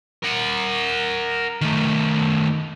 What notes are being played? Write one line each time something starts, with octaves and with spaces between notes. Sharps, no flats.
A#4 F#5
D#3 A3